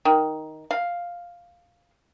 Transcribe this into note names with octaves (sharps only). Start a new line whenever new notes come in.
D#3
F5